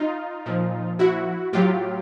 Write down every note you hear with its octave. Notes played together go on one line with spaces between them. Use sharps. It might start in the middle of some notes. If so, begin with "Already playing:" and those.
Already playing: D#4 F4
A#2 F3
E4 F#4
A2 F#3 F4 G4